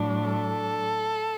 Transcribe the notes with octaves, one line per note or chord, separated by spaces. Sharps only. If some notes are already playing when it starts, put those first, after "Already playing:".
Already playing: A2 F#3 D4
A4